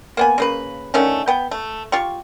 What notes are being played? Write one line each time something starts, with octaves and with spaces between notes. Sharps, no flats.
A#3 B3 G#5
C#3 A#3 B4
D3 D#3 A3 C#4
B3 G5
A3
F4 G4 C#6